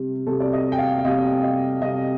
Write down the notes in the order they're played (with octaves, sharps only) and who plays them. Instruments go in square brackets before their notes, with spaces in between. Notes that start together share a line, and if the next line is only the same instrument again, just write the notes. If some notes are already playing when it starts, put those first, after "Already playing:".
Already playing: [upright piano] C3 G3
C3 G3 A4
D5
D#5
G5
F5
F5
C3 G3 D#5
D#5
C3 G3 D#5